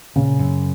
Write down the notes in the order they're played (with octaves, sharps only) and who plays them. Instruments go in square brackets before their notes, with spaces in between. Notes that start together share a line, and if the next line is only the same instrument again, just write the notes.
[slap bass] A#2 [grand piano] C#3
[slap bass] F#2